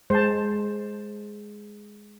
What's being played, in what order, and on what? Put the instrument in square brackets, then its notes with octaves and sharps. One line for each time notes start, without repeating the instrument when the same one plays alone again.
[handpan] G#3 [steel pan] C5 A5